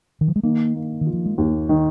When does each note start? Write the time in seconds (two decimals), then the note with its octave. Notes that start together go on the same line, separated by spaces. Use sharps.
0.21 D#3
0.28 F3
0.36 G#3
0.43 D#3 A#3
0.76 A#3
1.01 D#3
1.06 F4
1.13 F3
1.26 G#3
1.38 D#2 A#3
1.69 D#3